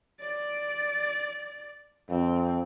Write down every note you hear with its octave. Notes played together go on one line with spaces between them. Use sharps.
D5
F2 C4